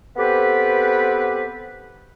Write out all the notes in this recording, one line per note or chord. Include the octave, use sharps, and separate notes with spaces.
B3 C4 G4 A4 B4